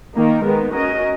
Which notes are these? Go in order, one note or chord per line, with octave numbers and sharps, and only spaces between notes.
D#3 A#3 D#4 A#4
D#3 G#3 B3
C#4 F#4 A#4 D#5